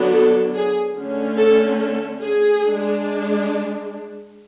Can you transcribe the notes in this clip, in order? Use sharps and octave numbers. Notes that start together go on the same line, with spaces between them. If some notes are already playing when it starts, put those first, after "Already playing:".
Already playing: D3 F#3 B3 D4
A4
G#4
D3 A3 C#4
A4
A4
G#4
G#3 D4